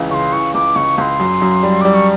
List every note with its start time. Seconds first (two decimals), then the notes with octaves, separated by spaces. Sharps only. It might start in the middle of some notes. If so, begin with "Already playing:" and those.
Already playing: C#2 C#3 E3
0.10 C#3 C#6
0.14 C6
0.32 E3 C#6
0.54 C#2 D6
0.76 C#2 C#6
0.98 C#2 C6 C#6
1.19 F#2
1.42 F#2
1.63 G3
1.81 G3 D6
1.94 C#6